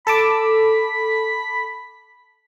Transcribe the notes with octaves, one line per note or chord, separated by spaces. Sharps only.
A4 A5 B5 D6